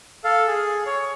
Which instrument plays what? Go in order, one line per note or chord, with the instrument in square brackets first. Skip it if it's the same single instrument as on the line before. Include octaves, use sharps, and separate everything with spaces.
[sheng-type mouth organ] A4 F5
G#4
C#5